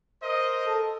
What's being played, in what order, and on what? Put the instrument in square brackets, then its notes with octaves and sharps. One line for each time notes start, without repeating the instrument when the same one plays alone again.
[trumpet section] A#4 C5 D#5
[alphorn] A4